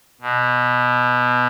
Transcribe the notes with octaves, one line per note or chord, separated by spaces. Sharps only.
B2